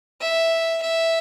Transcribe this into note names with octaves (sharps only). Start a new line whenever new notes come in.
E5
E5